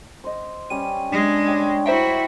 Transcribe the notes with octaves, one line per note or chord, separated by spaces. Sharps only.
C5 D#5
G3 C#4 D#7
G#3 D4
G4 C#5 C6
E4 F#4 C5 E5 G5 A#5